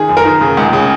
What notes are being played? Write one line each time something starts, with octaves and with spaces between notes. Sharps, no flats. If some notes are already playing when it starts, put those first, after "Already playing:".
Already playing: D#3 G#4
F#2
A#4
D#3
C#3
C#2
C#3